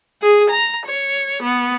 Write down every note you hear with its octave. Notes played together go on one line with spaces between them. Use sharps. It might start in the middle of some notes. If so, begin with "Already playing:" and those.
G#4
A#5
C#5
B3